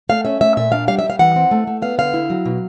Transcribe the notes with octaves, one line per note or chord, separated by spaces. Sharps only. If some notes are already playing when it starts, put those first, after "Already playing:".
A3 F5
C#4 E5
A3 E5
A#2 E5
D4 F5
G3 F5
E5
G3
F5
E3 F#5
C4
A3
A3
B3 F5
D3 F5
E4
F#3
B2